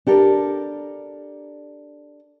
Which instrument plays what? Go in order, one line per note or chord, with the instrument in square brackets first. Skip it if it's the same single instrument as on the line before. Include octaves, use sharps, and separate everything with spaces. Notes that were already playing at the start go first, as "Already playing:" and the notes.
[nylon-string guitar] D4 G4 A4 A#4